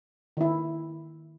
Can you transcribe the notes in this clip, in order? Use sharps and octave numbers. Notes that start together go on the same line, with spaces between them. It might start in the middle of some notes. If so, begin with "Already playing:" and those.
D#3 E4